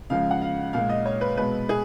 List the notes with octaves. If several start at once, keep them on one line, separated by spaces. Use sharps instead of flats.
C#3 F3 G#3 F5
F#5
F5
A#2 G#3 F5
D#5
C#5
B4
B2 G#3 B4
G#4